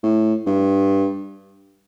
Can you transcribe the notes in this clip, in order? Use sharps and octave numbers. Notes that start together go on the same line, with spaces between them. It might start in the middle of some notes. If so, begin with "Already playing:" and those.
A2
G2